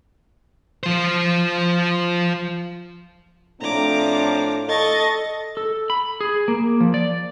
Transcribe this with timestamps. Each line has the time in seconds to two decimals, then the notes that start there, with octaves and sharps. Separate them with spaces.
0.83 F3 C5
3.61 A2 F3 C4 D4 A#5 D6
4.68 A4 D#5 C#6 A6
5.57 A4
5.90 B5
6.21 G#4
6.48 A#3
6.80 F3
6.94 D5